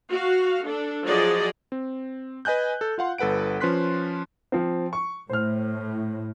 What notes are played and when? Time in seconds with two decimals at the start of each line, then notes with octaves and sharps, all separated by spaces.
0.10 F#4 F5
0.67 D4 A4
1.07 F3 F#3 F#4 G#4 D5 D#5
1.72 C4
2.45 B4 D#5 G#5 F#6 G6
2.81 A4
2.98 F4 F5 F#5 C6
3.18 G1 A4 B4 F#5 D7
3.60 F3 C#4 B4 C6 F#6 B6
4.52 F3 C4
4.93 C#6
5.29 A2 C5 F6